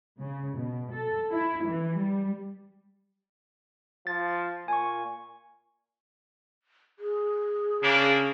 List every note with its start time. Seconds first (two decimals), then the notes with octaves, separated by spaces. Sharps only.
0.19 C#3
0.56 B2
0.92 A4
1.32 E4
1.66 E3
2.00 G3
4.07 F3 A6
4.68 A#2 G#5 C#6
6.99 G#4
7.83 C#3 A#3 D4